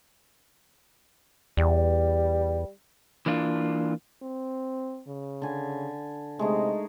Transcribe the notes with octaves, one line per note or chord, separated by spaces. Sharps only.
E2 G3
E3 A#3 D4 F4
C4
C#3
D3 G#5
C3 G#3 A3 D#4